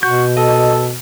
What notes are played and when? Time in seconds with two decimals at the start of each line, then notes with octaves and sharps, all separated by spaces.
0.03 B2 F#4 G6
0.37 A4 D#5